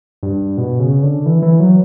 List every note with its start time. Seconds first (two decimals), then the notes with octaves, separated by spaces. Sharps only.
0.23 G2
0.57 B2
0.79 C#3
1.03 D3
1.26 E3
1.42 E3
1.60 F#3